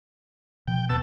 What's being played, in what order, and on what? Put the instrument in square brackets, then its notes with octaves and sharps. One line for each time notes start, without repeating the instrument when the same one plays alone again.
[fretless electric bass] B2 F3 [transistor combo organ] G5
[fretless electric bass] D#1 D#2 B3 [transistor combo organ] B2 A5 E6